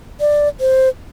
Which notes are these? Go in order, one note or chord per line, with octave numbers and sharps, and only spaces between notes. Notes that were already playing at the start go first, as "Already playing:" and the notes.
D5
C5